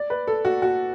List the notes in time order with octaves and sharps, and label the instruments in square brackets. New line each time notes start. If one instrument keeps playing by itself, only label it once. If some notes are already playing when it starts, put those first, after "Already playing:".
Already playing: [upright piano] D5
B4
A4
F#4
F#4